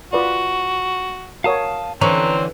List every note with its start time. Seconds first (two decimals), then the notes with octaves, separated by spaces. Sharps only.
0.13 F4 F#4 B4 D5
1.44 F#4 A#4 C#5 F5 A5 D#6
2.01 D3 E3 C4 C#4 A#5